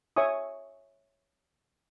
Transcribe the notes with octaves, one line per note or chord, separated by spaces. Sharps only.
C#5 E5 G#5 C#6 D#6